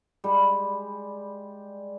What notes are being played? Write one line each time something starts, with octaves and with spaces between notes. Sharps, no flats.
G3 G#3